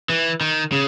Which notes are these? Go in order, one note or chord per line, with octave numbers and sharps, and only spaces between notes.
E3
D#3
C#3